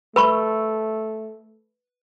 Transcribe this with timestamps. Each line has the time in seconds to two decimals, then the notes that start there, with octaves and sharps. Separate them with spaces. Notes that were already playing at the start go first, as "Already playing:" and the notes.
0.16 A3 B4 B5 C#6